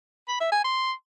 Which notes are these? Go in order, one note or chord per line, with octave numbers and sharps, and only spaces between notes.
B5
E5
G#5
C6